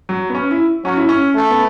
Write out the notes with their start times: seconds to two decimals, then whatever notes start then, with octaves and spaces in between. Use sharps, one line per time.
0.09 F#3
0.30 B3
0.35 C#4
0.51 E4
0.85 F#3 C#4
0.97 E4
1.09 C#4
1.35 A3
1.50 B3